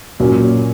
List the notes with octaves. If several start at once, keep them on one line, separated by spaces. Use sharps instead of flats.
A#2 F#3 A#3 C#4